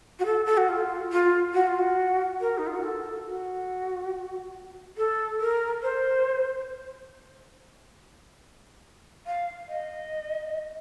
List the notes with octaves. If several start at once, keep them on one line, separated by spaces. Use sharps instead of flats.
F#4
A4
A4
F#4
F4
F4
F#4
F4
F#4
A#4
D#4
F4
F#4
A4
F#4
A4
A#4
C5
F5
D#5